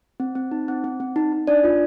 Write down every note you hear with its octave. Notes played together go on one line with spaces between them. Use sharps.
C4
C4
D#4
C4
C4
C4
D#4
D#4
D4 D5
F4